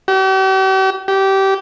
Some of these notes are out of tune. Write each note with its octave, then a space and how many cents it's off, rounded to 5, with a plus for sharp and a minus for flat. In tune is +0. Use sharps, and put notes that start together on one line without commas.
G4 -45
G4 -20